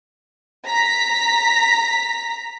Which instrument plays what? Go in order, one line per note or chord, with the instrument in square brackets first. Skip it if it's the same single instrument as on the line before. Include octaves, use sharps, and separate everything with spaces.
[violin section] A#5 B6